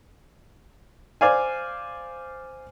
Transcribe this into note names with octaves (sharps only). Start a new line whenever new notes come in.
C5 D5 F5 G#5